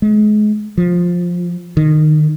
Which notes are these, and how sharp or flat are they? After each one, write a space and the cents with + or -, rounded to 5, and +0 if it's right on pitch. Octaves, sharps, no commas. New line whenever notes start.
G#3 +30
F3 +10
D#3 -25